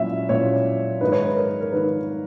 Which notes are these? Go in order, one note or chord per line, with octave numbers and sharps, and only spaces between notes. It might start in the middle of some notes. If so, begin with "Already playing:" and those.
Already playing: A#2 F#3 C#4 E4 E5
A#2 F#3 C#4 E4 C#5
G#2 D#3 A#3 D#4 B4
C#5
B4
A#4
A#4
D#3 A#3 D#4 B4